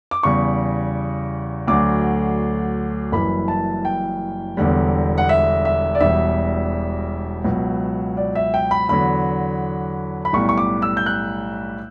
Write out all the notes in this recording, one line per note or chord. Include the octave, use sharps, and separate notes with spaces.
D6
E2 C#3 G3 C#6
D2 D3 F#3 D6
F#1 F#2 E3 G3 B5
A5
G5
E1 E2 D3 G3
F#5
E5
E5
D5
E1 E2 B2 G3 E5
C#2 B2 F#3
D5
E5
G5
B5
E2 D3 F#3 B5
B5
B1 A2 G3 C#6
C#6
D6
E6
G6
F#6